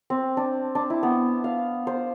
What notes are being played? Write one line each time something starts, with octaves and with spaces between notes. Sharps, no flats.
C4
D4
D4
E4
B3
F5
C5